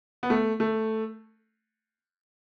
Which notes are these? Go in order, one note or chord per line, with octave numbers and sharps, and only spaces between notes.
B3
A3
A3